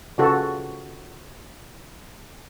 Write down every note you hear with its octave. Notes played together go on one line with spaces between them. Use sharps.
C#3 F4 F#4 A4